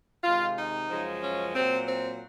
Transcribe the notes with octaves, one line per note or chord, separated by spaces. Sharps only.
C3 D#3 G#3 F4
D#4
F#2 C#3 F3 G#3
C#4
A#2 F#3 C4
C4